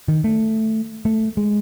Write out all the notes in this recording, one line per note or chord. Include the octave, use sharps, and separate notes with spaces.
D#3
A3
A3
G#3